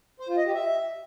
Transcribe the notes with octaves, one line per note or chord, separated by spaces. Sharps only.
C5
F4
D#5
G4
E5